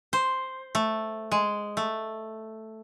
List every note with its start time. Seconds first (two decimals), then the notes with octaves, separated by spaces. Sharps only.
0.13 C5
0.75 A3
1.31 G#3
1.77 A3